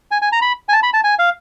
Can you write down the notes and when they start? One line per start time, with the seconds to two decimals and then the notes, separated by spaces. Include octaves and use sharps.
0.11 G#5
0.22 G#5
0.32 A#5
0.42 B5
0.69 G#5
0.73 A5
0.83 B5
0.93 A5
1.04 G#5
1.19 F5